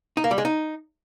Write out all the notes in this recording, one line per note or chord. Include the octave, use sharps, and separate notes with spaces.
D#4
A#3
G3
G#3
D#4